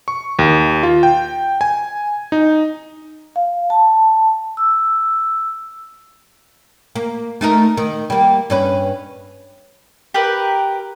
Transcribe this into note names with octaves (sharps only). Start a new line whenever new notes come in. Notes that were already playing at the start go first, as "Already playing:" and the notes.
C#6
D#2
F4
G5
G#5
D#4
F5
A5
E6
A#3
A3 D#4 A#4
D#3
G3 A#3
G2 C#4 B4
G4 A#4 B4